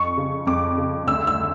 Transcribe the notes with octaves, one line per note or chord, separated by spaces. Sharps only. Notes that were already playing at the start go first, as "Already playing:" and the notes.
Already playing: F2 C#6
C#3
F2 D6
C#3
D2 E6
E6